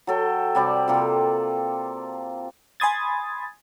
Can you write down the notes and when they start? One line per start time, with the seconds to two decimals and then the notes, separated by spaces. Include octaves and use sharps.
0.07 F#3 A4 G5
0.55 C3 G3 D5 D6
0.88 C3 A#3 F4 A4
2.80 G#5 B5 C6 D#6 G#6 A6